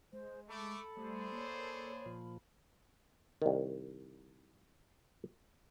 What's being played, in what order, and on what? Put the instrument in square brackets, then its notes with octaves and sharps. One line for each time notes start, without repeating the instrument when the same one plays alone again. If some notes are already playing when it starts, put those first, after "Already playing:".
[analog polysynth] G#3 [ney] C5
[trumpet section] A3 D6 [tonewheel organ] A4 [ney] B5
[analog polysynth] G3 A3 [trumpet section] D4 G#4 C5
[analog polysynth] A#3 C#5
[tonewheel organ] A#2 F3
[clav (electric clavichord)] C2 D#3